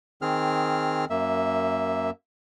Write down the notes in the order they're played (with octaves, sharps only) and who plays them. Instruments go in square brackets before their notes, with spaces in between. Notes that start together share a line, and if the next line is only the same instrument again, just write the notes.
[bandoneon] D#3 C4 G#4 F6
F#2 A#3 E5